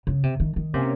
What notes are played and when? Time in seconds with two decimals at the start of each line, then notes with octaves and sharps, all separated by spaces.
0.07 C#3
0.23 C3
0.40 D#3
0.56 D#3
0.73 C3 A#3 C#4